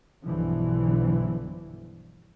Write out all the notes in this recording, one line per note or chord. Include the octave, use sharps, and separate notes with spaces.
B1 G2 B2 D3 E3 F3